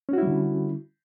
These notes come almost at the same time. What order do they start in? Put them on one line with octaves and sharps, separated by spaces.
C#4 F#4 E4 G3 D3